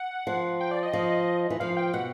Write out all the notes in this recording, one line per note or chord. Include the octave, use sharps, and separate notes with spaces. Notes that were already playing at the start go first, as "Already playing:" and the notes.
Already playing: F#5
F3
G5
D5
D#5
F3
E3
F3 F5
G5
B2 F#5